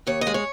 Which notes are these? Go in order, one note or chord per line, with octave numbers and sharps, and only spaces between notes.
D#2 C#5
D#5
G#3
C#5